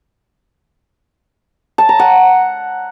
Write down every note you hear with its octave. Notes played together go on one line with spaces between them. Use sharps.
A5
A#5
F#5